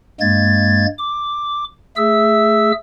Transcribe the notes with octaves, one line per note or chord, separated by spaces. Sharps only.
G2 G#3 A#3 G#6 A6
D6
A3 G#4 E5 E6